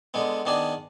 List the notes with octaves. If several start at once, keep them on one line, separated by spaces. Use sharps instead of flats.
D3 G#3 B3
D#3 B3 D4 G#4 D5